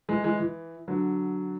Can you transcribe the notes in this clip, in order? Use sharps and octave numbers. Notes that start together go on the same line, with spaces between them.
E3 G#3
E3 G#3
E3
D3 F#3